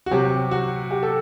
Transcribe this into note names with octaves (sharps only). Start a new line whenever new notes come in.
F#4
C3 F#3 G4
F#4
G4
A4